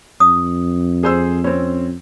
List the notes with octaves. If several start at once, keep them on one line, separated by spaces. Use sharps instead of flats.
F2 D#6
G#4 C5 E6
C4 C#4